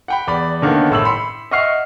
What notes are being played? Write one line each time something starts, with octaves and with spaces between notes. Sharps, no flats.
F#5 G5 B5
E2 D5 B5
D3 D#3 A#3 B3 C#4
F#1 A2 E6 F#7
B5 C6 C#7
D#5 E5 F#5 C#6 F6 C7